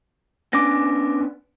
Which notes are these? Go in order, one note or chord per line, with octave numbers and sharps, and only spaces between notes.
B3 C#4 D4 D6 A#6